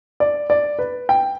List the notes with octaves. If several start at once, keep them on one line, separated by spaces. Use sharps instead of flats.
D5
D5
B4
G5